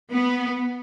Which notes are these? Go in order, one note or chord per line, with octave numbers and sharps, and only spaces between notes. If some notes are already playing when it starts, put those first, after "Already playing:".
B3